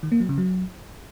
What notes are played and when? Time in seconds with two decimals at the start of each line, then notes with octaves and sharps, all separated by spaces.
0.03 D#3
0.12 A#3
0.20 F#3
0.29 C#3
0.38 F#3